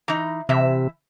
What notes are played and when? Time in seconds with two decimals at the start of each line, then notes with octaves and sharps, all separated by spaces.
0.08 E3 D#4
0.49 C3 E3 E5